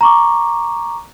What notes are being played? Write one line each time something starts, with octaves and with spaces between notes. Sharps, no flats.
A#5 C#6 D6